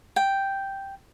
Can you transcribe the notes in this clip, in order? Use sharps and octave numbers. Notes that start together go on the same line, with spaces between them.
G5